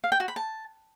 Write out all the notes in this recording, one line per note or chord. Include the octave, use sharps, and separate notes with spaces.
F5
G5
F#4
B5
A5